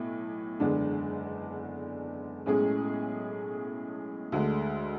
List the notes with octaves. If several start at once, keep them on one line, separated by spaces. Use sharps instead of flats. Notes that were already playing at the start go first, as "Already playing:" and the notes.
Already playing: B1 A2
F#1 E2 D3 G#3 D4
B1 A2 G#3 C#4 G#4
D2 D3 G#3